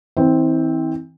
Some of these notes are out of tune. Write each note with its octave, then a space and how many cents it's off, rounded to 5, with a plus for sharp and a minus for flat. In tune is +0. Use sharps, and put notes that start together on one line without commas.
E3 -40 C4 +0